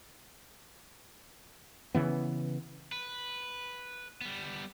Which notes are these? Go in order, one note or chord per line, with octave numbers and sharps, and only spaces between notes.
C#3 E3 B3
B4
G3 B3